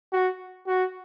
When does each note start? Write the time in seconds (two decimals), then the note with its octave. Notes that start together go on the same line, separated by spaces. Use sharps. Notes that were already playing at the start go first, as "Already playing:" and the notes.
0.13 F#4
0.67 F#4